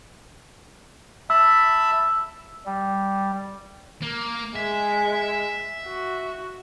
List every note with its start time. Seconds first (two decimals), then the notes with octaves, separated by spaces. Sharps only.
1.30 E5 A5 B5 E6
2.66 G3
4.02 A#3
4.56 G#3 G#4 E5
5.86 F#4